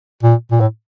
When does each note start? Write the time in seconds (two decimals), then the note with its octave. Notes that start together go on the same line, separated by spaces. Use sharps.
0.23 A#2
0.52 A#2
0.60 A2